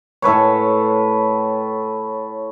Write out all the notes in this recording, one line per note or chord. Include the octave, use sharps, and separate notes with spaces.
A2 A4 B4 C#5